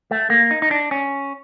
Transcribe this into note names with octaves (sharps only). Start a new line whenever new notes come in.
A3
A#3
D#4
D#4
D4
C#4